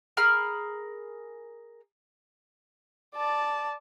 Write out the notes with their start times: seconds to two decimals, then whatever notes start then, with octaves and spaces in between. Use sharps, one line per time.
0.17 G#4 A#4 B5 F6
3.15 D5 A5